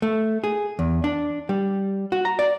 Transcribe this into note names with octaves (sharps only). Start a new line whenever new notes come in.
A3
G#4
E2
D4
G3
F#4
A#5
D5